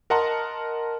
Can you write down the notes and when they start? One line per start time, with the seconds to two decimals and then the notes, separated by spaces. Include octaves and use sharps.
0.10 A#4 D#5 F#5 A5 A#5 C6